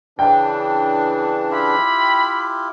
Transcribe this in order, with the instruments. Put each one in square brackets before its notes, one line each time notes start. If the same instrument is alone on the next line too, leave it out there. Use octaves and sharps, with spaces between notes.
[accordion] C#3 E3 D4 [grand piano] G5
[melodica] E4 F4 G4 [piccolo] B5